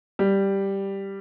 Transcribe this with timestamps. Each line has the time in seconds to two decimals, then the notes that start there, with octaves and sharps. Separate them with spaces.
0.19 G3